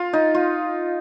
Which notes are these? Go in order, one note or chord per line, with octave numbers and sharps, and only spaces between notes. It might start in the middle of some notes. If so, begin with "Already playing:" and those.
Already playing: F4
D#4
F4